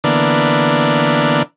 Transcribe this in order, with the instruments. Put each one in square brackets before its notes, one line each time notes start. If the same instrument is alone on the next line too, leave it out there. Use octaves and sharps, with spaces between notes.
[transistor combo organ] D3 E3 A#3 B3 D4